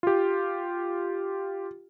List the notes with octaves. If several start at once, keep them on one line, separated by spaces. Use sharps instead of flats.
F4 G4